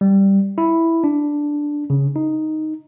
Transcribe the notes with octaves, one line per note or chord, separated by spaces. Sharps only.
G3
E4
D4
C#3
D#4